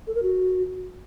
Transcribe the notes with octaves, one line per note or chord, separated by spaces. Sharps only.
A4
A#4
F#4